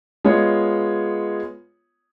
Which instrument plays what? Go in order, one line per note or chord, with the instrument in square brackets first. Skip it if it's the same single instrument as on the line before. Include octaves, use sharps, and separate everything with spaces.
[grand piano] G#3 B3 F4 C#5